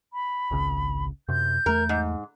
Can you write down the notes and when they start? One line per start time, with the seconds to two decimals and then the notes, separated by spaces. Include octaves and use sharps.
0.13 B5
0.51 G#1 C#2 C#3
1.28 F#2 C3 G6
1.66 E2 A3 A#4
1.89 G#2